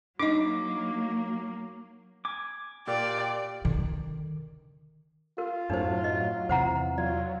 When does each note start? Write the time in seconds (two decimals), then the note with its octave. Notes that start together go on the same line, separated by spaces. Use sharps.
0.19 F#3 A#3 D4 D#4 D#5 D6
2.25 G#5 D6
2.88 A#2 G4 D5 G5
3.65 D3 D#3
5.38 F4 A#4
5.70 F#2 A2 F#3 D4 D#4 C5
6.04 D#5
6.49 E2 C3 E3 C5 F#5 A#5
6.98 F#3 F4 D5